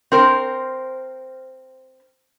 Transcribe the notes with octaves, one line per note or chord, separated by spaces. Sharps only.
C4 A#4 C5